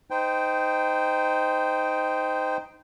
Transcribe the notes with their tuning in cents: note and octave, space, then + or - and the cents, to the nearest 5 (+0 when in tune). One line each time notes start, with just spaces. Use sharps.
D#4 +0 C5 -20 G5 +0